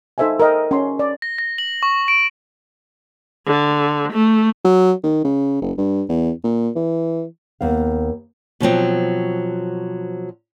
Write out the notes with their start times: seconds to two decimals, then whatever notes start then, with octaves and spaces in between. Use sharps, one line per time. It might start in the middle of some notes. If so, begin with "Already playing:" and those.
0.18 D#4 A4 C5 E5 F5 G#5
0.40 A#4 D#5 G5
0.71 C#4 C6
0.99 D5
1.22 A#6
1.38 A#6
1.58 F#7
1.83 C#6
2.08 D7
3.46 D3
4.13 A3
4.65 F#3
5.03 D#3
5.24 C#3
5.61 F#1
5.78 G2
6.09 E2
6.44 A#2
6.76 E3
7.61 D#2 B3 F5
8.60 B2 F3 F#3 C4